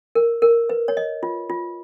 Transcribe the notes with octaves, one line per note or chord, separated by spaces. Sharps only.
A#4
A#4
B4
C#5
D#5
F4
F4